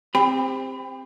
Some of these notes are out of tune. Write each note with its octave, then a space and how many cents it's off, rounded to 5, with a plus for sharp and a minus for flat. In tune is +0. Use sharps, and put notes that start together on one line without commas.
C4 +0 G4 +35 B5 +20